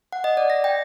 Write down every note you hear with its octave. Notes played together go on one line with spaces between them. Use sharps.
F#5
D#5
D5
A#6
G5